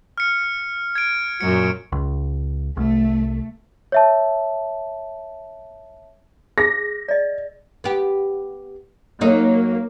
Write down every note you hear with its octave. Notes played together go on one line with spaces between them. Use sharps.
F6 C#7
G#6 D7
F#2 A#2 F#3 C#7
C#2
C2 A3
C#5 E5 A5
G#4 A#6
D5 D#5
B3 G4
F#3 A#3 D#4